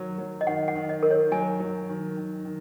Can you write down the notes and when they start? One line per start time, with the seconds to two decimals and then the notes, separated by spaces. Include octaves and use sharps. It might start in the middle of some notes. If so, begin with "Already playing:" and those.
Already playing: D#3 F#3
0.18 F#3
0.41 D#5
0.47 D#3 F#5
0.68 F#5
0.75 D#3
0.89 D#5
1.03 D#3 A#4
1.11 C#5
1.32 F#3 G#5
1.60 F#3
1.89 D#3
2.17 D#3
2.45 D#3